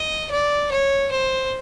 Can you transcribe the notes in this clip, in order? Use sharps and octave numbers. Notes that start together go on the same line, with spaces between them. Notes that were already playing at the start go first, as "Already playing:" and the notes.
Already playing: D#5
D5
C#5
C5